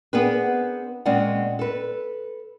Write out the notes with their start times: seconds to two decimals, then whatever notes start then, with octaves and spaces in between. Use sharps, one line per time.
0.13 B3 C4 D4 G#4 A#4 B4
1.05 A#2 G#3 C4 C#4 D5 F#5
1.59 A4 B4